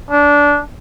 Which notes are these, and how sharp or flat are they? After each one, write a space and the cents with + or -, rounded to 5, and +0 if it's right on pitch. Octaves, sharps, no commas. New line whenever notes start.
D4 -20